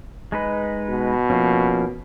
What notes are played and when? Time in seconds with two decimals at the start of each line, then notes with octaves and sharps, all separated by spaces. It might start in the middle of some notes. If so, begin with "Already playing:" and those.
0.32 G#3 D#4 B4
0.90 B2
1.30 F3 A#3 C#4